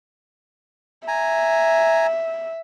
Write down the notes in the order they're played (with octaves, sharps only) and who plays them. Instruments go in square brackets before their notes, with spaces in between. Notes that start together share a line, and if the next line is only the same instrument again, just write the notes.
[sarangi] E5 [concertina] G#5 A#5